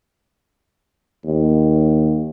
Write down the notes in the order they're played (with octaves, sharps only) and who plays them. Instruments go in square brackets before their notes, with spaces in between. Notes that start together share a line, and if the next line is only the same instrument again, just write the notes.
[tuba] D#2